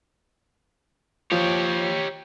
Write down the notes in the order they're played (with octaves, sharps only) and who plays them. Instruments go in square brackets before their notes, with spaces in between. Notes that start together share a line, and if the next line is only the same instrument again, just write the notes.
[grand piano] F3 [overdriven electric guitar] G4 C#5